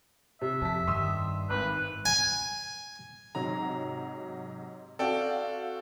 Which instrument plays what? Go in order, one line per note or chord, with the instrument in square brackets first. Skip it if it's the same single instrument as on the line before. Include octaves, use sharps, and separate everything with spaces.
[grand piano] C3 [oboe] E5
[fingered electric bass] F2 [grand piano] A5 B6
[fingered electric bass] G2 D#3 [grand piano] C6 D#6 E6
[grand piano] G#1 [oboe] B4
[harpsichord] G#5
[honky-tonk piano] G#2 C3 F#3 [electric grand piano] A#5
[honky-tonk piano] C4 F#4 F5 [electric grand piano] A4 D5 G5